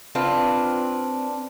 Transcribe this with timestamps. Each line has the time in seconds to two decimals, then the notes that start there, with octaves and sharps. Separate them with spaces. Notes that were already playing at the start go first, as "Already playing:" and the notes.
0.15 C4 D4 F4 B4